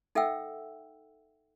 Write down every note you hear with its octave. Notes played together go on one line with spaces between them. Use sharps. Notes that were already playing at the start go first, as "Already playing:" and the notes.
D#4 A4 E5 F#5 G5 E6